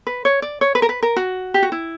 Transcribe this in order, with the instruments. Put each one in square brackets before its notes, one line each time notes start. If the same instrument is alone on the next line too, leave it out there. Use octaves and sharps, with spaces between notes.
[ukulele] B4
C#5
D5
C#5
B4
A#4
B4
A#4
F#4
G4
F#4
E4